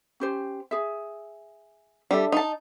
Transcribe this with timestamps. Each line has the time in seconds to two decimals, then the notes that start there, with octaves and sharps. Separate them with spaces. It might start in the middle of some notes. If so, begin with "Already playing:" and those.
0.20 C#4 G4 C5
0.71 G#4 E5
2.11 G3 D4 A4 E5
2.32 D#4 A5